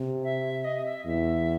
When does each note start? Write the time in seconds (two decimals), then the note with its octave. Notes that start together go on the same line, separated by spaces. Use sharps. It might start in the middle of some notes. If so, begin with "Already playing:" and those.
Already playing: C3
0.23 E5
0.65 D#5
0.85 E5
1.06 E2 E5